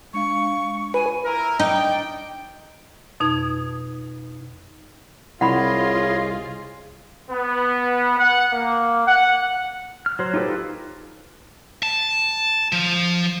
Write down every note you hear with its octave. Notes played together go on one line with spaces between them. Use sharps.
G#3 D4 F5 C#6
F4 B4 G#5
E4 A#4
D#4 D5 G5
F2 B2 D#4 D#6 G#6
C2 F4 G#4 C#5 D#5 F#5 B5 C6
B3
F#5
A#3
F#5
F6
F#3 C5
D#4 F4 G4 A4 B4
A5
F3